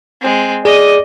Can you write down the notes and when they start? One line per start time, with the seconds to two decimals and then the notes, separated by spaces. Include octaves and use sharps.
0.21 G#3 C4
0.65 G#4 D5 D#5 D#6